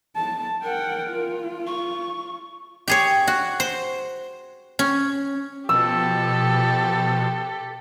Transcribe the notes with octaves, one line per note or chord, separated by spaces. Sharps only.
A5
A#4 F#5 G5
F4
C#6
G4 G#4 C#5
F#4
C5
C#4
B2 F3 G4 A4 E6